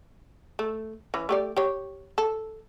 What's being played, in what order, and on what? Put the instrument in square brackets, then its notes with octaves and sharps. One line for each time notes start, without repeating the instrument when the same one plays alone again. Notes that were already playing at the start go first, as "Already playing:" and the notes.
[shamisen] A3
E3 C#4
A3 G4 D5
G4 C#5
A4